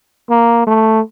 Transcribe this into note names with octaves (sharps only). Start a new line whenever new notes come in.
A#3
A3